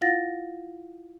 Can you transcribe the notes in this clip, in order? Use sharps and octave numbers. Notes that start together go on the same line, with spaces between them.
E4 F4 F5 F#5 A6 A#6